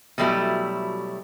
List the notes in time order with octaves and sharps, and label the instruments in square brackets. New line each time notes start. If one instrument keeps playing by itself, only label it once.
[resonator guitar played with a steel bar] B2 F#3 G3 A3 E4